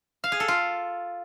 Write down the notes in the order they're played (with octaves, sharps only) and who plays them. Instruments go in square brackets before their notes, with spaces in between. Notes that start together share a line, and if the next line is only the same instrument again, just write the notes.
[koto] F5
G#4
A4
F4